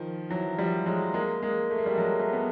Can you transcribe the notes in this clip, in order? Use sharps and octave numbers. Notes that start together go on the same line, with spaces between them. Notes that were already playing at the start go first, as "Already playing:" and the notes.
Already playing: D#3 F3
E3 F#3
F3 G3
F#3 G#3
G#3 A#3
G#3 A#3
A3
A#3
G3 A3
F#3 G#3
G3 A3
B3